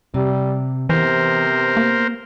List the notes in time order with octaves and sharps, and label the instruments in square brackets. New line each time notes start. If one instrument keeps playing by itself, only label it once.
[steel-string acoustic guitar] C3 [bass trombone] G3
[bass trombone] C3 [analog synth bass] E3 [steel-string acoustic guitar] B3 [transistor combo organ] A#4 C5
[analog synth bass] A#3